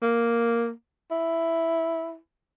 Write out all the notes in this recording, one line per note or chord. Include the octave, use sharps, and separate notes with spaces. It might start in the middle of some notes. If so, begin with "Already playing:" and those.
A#3
E4